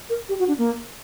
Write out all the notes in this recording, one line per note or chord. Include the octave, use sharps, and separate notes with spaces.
A#4
G4
F#4
D4
A#3